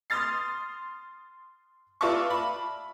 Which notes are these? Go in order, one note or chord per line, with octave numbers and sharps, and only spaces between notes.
C6 D#6 F6 A6 C7
F4 B4 D5 E5 A5 C#6
B5